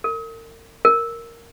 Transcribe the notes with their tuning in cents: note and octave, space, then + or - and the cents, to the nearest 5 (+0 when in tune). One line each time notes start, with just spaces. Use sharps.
A#4 -40
A#4 -5